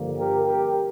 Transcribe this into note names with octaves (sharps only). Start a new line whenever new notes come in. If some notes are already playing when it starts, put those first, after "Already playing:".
Already playing: G2 D3 F3 A#3
G4 A#4
G4 A#4